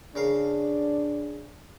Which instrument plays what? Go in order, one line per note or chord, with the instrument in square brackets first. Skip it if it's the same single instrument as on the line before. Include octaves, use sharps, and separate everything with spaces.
[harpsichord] C#3 A#4 F5 [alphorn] D4